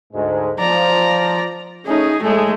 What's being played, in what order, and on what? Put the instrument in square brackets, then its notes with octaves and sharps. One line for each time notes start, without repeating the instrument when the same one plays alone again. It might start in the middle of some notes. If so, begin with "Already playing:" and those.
[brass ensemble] D2 G#2 G#3
[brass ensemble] F3 [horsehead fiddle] D5 A#5
[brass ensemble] A3 C#4 [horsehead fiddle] D#4 G#4
[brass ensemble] A2 G#4 [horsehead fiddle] G#3 A3